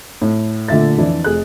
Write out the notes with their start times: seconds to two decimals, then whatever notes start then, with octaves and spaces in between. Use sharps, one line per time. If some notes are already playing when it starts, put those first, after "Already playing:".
0.22 A2
0.68 A#2 D3 A3 E5 A6
0.98 F2 E3 D4 E4
1.24 F1 G#4 F#6